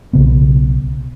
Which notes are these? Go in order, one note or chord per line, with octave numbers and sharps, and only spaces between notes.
B1 C#3 B3